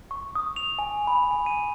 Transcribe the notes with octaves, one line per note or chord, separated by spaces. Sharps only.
C#6
D#6
F7
G#5
B5
G#5
D#7